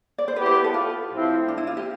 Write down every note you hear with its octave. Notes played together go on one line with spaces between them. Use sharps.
D5
C5
B3 E4 G4 B4
C5
B4
A4
F4
A2 F3 C4 E4
D4
E4
F4
G4